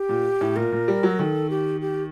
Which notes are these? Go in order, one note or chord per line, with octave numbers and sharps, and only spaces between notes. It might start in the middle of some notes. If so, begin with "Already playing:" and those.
Already playing: G4
A#2
A2
A#2 A#4
A#2
G3
F#3
D#3 A4
G4
G4